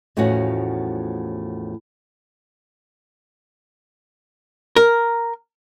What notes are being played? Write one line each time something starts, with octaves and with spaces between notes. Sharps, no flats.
E2 A2 F3 C#4 F#4 F#5
A#4